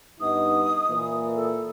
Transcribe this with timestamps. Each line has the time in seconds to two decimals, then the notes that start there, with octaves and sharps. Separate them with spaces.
0.21 G2 B3 D#4 D#6
0.89 A#2 E3
1.35 A4